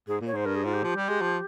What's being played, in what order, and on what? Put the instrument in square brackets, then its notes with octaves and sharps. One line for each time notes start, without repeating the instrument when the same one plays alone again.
[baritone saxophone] G#2 [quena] G#4
[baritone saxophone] A#2
[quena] C#5
[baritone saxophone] G#2 [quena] C5
[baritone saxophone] G2 [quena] A#4
[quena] G#4
[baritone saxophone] G#2 [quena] F4
[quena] G4
[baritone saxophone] F3
G3
G#3
F3